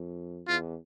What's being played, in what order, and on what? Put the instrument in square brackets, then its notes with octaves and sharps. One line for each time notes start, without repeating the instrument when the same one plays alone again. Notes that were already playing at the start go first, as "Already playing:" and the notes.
Already playing: [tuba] F2
[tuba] E2 [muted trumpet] F4